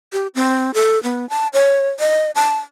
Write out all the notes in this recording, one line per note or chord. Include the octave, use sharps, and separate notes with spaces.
G4
C4
A4
B3
A5
C#5
D#5
A5